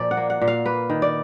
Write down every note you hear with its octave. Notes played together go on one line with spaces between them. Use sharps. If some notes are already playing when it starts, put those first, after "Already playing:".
Already playing: A#2 F3 D5
F#5
A#3
F#5
A#2
F5
A#3 B4
D#3
D5